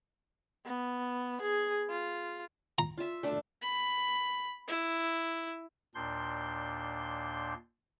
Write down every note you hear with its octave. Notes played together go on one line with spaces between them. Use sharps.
B3
G#4
F4
A#5
F4 E5
A3 D4
B5
E4
D#2 A#2 D4 C6 G6